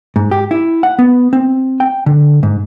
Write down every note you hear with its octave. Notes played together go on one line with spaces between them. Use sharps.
G#2
G4
E4
F#5
B3
C4
G5
D3
G#2